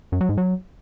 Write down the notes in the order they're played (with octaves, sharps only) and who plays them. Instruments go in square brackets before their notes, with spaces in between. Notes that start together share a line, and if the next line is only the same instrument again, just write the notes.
[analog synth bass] F#2
F#3
G#2
F#3